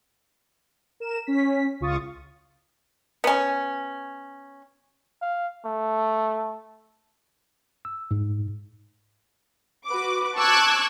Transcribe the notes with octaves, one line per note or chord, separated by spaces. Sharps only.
A#4 E7
C#4 B6
C#2 F4 C#6 D#6 A6
B3 C#4
F5
A3
E6
G#2
F#4 B4 D6
A5 C#6 D6 E6 F#6 G#6